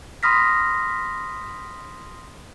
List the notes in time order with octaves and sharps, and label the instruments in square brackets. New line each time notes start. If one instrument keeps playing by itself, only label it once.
[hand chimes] B5 C6 D#6 F6 A#6 B6